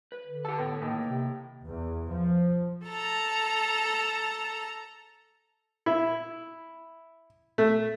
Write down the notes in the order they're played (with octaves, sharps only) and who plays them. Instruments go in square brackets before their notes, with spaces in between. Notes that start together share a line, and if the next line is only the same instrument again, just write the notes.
[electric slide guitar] B4
[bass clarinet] D3
[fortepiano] G4 A4 [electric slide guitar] F#5 A5
[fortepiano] A2 B3
[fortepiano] A2 D#3 [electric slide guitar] A#3
[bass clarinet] C3
[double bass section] E2
F3
[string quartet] A4 A5 A#5
[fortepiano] E4
A3